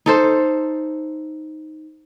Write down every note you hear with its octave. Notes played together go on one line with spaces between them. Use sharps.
D#4 A4 C5